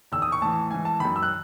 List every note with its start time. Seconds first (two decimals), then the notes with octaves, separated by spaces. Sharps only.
0.12 E2 D#3 E6
0.22 D#6
0.32 C#6
0.42 A2 E3 A5
0.70 G#2 E3 G#5
0.85 A5
1.00 F#2 D#3 B5
1.16 E6
1.23 F#6